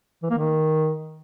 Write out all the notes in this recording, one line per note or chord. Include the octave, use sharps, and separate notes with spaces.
E3
A#3
D#3